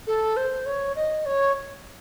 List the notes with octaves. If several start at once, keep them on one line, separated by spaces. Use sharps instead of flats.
A4
C5
C#5
D#5
C#5